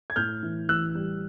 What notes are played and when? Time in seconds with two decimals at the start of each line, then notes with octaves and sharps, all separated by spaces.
0.10 G#6
0.16 A2 F6 G6
0.43 E3
0.68 A1 E6 F#6
0.95 G3